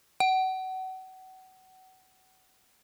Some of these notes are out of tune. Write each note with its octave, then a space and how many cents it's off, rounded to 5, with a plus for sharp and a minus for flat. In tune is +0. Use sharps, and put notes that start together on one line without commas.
F#5 +30